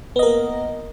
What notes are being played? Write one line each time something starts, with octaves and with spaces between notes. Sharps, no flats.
A#3 B3 A#4 D#5